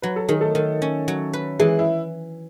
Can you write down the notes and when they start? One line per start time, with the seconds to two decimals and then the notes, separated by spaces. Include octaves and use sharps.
0.02 F#3 B4
0.16 A4
0.29 D#3 G#4
0.41 A3 A4
0.55 D#3
0.82 C#4
1.08 F#3
1.33 B4
1.59 E3 G#3 G#4
1.79 E4